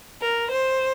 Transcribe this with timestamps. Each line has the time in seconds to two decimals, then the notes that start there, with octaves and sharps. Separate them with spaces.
0.21 A#4
0.52 C5